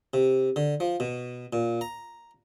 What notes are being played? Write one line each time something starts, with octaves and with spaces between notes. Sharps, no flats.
C3
D3
F3
B2
A#2
A#5